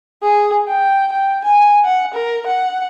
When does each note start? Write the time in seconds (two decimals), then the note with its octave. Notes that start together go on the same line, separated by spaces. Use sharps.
0.23 G#4
0.68 G5
1.12 G5
1.44 G#5
1.84 F#5
2.14 A#4
2.47 F#5